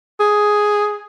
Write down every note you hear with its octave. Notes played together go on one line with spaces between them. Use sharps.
G#4